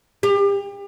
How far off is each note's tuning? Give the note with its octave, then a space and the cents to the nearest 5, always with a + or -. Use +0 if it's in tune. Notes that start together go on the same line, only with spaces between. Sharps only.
G4 +35